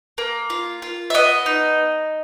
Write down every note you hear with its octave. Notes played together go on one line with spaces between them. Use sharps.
A#3
F4
F4
E5
B3 D#5
D#4